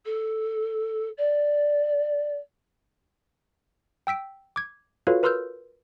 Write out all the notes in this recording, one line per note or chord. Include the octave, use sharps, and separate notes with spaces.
A4
D5
G5 E6 B6 D7
D6 G#6
F4 F#4 A4 B4 C#5 F5
A#4 B4 C6 E6 F6 G6